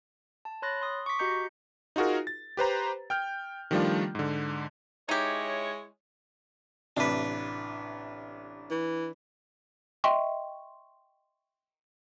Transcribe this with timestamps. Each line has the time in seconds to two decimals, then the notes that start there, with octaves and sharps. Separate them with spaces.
0.45 A5
0.62 C#5 B5 C6 F#6 A6 A#6
0.82 C6 D#6
1.06 C#6 D6 B6
1.19 F#4 G4 D#5 A#5 G6 C#7
1.96 D#4 F4 F#4 G#4 A#4
2.27 A6
2.57 G4 B4 C5 A#5
3.10 G5 F6 G6
3.71 D#3 F3 G3 A3 D4 F4
4.15 G#2 D3
5.09 G#3 D#4 E4 G4 C#5
6.97 A1 C3 D4 B4
8.70 E3
10.04 D#5 E5 G5 C6 C#6